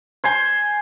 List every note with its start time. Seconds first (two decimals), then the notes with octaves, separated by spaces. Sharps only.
0.24 C5 G#5 C6